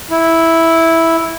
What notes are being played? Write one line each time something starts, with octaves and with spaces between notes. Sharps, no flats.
E4